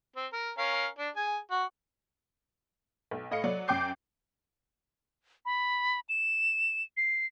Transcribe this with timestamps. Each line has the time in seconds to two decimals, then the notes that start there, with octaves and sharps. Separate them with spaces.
0.16 C4
0.33 A#4
0.58 C#4 A#4 F5
0.98 D4
1.16 G#4 G#5
1.51 F#4
3.11 B1
3.31 A2 D#5 F5 C#7
3.44 F#3 D5
3.68 F#2 G5 D6 G6 C7
5.45 B5
6.09 E7
6.97 C7